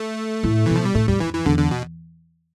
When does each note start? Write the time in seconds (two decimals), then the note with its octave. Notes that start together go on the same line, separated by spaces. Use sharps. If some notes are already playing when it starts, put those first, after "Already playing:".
Already playing: A3
0.43 A2
0.66 B2 E3
0.76 F3
0.85 G3
0.95 A2 A3
1.08 E2 G3
1.20 F2 E3
1.34 E3
1.46 E2 D3
1.59 D3
1.71 B2